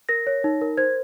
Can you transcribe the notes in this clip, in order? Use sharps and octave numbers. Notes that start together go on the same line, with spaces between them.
A#4 A#6
C#5
D#4
A#4
C5 G#6